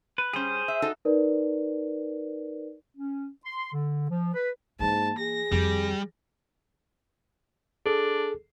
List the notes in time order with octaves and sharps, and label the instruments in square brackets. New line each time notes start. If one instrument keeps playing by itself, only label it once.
[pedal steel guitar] B4
[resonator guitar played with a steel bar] G3 C#4 [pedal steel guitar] G#4 C5
[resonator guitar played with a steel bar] E5
D#4 F#4 A4
[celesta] D#4 A#4 B4 D5
[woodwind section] C#4
C6
D3
F3
B4
[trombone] G#2 [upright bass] E3 A#3 [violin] A5
[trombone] G#4 [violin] A#6
[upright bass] F2 D#3 [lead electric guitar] G3
[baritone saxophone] D4 [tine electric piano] G#4 A4